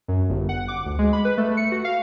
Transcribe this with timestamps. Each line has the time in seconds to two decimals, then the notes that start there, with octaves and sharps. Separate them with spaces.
0.08 F#2
0.29 G1
0.49 F#5
0.68 D6
0.86 D2
0.99 G#3
1.13 B5
1.25 B4
1.38 A3
1.57 C#7
1.72 F#4
1.85 F5